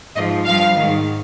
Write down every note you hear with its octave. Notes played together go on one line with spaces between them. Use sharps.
G#2 F3 D#5
G2 F3 F5
G#2 D#3